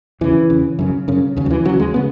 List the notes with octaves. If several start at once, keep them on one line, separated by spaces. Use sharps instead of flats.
E2 C#3 E3
E2 C#3
F#2 C#3
F#2 C#3
D#2 C#3
F#3
E3
D#2 C#3 F#3
G#3
C#3 B3